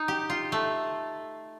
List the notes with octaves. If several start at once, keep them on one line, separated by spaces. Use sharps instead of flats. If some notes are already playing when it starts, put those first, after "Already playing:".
Already playing: D#4
G4
F4
A3